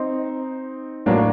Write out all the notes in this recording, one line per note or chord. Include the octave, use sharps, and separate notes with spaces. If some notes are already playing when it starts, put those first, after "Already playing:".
Already playing: C4 D#4
A1 A2 F#3 A#3 D4